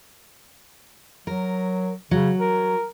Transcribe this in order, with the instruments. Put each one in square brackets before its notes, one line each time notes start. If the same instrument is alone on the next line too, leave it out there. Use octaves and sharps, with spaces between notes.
[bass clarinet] F#3 [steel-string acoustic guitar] A#4
[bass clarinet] C#3 [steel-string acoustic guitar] F#3
[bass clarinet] A#4